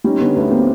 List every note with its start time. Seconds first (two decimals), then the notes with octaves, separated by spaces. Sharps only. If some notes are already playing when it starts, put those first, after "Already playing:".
0.04 G3 C#4 D#4
0.20 D3 B3 C#4
0.36 D2 B3
0.51 A#3 C4